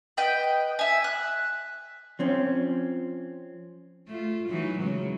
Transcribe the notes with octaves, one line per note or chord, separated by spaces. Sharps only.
B4 D#5 G5
E5 G#5
F#6
F3 C4 C#4
A3 F4
E3 F#3 D#4
C#3 F#3 G#3